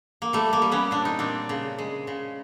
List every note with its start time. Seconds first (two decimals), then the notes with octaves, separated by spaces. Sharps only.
0.22 A#3
0.33 G3 A3
0.53 A#3
0.62 G3
0.72 B3 C#4
0.91 A#2 D4
1.05 D#4
1.19 A#2 C4 D4
1.49 C#3
1.78 G#3
2.07 C#3